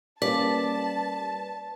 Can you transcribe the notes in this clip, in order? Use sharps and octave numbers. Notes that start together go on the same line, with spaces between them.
G3 A#3 C#4 B4 D5 A5